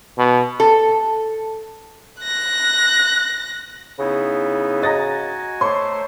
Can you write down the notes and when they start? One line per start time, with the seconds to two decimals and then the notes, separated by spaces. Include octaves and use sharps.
0.18 B2
0.60 A4
2.22 F#6 A#6
3.99 C#3 B3 D#4 E4
4.82 F#4 D#5 G#5 A#5 D#6 A6 A#6
5.61 A3 C5 C#5 C6 D6